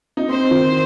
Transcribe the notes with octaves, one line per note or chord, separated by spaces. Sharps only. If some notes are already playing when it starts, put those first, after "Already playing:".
D#4
C4 C5
D#3